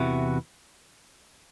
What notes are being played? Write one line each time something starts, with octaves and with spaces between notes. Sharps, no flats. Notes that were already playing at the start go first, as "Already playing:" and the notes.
Already playing: E2 C3 E3 E4 F#4